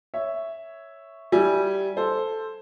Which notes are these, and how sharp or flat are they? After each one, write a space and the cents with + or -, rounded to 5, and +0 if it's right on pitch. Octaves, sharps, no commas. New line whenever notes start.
C#5 +0 E5 +0
G3 -10 E4 +0 G#5 +0
A4 +0 C5 +0